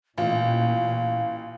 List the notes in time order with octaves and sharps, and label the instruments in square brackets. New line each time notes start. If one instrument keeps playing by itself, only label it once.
[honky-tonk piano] A1 F4 [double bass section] A#2 [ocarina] F5